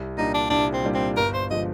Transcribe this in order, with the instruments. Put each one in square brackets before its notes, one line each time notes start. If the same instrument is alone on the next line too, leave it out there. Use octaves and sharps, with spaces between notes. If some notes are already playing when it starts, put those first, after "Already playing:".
Already playing: [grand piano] C2
[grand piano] A#2 G3 D4 [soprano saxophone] D#4
[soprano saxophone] D4
[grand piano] C2 [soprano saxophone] D4
[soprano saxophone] C4
[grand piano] A#2 G3 D4
[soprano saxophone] C4
[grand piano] G1 [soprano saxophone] A#4
[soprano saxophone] C5
[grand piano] D3 F3 G#3 [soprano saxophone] D#5